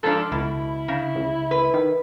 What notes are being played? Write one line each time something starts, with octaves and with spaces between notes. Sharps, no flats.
G#2 F3 D4 A4
C#2 B2 E4
C#3
C#2
B4
D#3